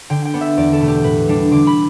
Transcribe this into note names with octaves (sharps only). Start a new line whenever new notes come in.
D3 G5
G5
B3 D4
E5
E2 D5
A4
B2 A3
G4
A2 B4
G3 D4
D3 D6
B5